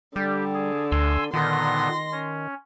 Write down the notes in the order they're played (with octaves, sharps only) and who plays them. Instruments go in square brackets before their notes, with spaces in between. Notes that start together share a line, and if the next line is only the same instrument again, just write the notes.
[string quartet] D3 [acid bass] G3 [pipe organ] G4
[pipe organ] G#4
[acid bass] D2 [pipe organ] G#5 C6 E6
[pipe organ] A#2 D3 B3 [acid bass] D#3 [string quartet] C6 A#6
[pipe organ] C#4